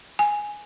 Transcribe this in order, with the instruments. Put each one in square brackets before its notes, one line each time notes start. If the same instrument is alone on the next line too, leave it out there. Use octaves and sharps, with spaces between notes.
[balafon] G#5